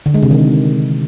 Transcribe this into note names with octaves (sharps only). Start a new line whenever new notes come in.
D3
G#3
C3
D#3